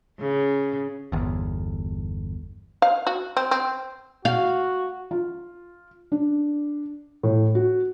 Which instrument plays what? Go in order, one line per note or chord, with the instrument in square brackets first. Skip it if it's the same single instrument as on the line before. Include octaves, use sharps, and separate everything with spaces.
[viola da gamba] C#3
[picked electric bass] G1 E2
[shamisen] F5
F#4
C4
C4
[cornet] F#4 [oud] F5
[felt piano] F4
D4
A2
F#4